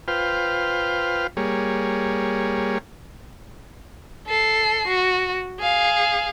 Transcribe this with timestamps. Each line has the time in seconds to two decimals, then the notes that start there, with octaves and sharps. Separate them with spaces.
0.08 F4 B4 C5 G5 F6
1.37 G3 A#3 G#4 C#5
4.27 A4 C7
4.87 F#4
5.59 G#4 F5